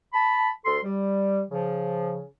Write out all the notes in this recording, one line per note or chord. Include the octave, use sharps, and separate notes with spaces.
A5 B5
D2 A4 C6
G3
C#3 F3